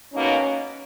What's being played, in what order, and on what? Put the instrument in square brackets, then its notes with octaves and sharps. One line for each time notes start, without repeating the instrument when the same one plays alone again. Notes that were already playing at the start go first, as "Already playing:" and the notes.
[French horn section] B2 A#3 D#4 [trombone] C#4